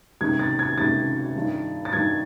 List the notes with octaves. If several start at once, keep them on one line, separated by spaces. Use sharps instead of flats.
C#2 C3 D#3 G#6
A6
G#6
C#2 C3 D#3 A6
G2 D#3
A6
G2 D#3 G#6